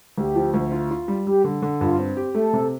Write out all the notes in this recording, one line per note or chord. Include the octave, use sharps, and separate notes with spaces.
D2 G4
F3
D2
F4
F4
G3
G3 G4
D3
D3
G2 F4
C4
G4
A3 A4
C3